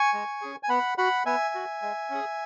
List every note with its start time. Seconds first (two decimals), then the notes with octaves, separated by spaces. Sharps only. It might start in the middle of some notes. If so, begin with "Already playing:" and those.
Already playing: G#5 C#6
0.13 G#3
0.41 C#4 G#4
0.63 G#5
0.69 B3 F#5 B5
0.98 F#4 F#5 B5
1.26 B3 E5 G#5
1.55 F#4
1.82 G#3
2.10 C#4 G#4